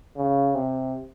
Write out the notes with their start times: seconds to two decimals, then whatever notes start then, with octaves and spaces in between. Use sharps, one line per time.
0.17 C#3
0.55 C3